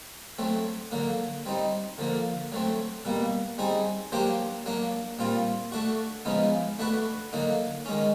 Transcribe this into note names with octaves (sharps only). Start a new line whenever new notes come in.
F#3 A3 C4
D3 F#3 A#3
G3 C4 D#4
D3 F3 A#3
F#3 A3 C4
B2 G3 A#3
G3 C4 D#4 G#4
F#3 A#3 D4 G4 C5
F#3 A#3 D4
A#2 G3 C4 F4
A3 D4 F#4
C#3 F3 G#3 B3 D#4
A3 D4 F#4 B4
D3 F#3 A#3 D#4
D#3 G#3 C#4